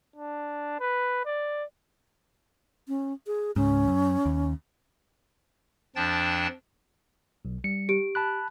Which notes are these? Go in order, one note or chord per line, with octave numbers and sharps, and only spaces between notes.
D4
B4
D5
C#4
G#4
C#2 G#2 C#4
F#2
D#2
F2 F3 D4 G5 A5 A6
B1
G3 C#7
G4 D7
A5 B5 F#6